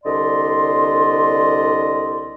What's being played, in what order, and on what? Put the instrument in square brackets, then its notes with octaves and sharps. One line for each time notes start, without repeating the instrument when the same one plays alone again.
[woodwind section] C2 D3 D5 D#5 C6